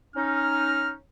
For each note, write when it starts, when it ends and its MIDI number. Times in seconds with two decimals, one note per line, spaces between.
0.16 0.95 61
0.16 0.95 63
0.16 0.93 89